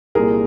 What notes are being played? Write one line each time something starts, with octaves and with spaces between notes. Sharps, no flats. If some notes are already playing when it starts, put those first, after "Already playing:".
C2 A#2 G#4 A#4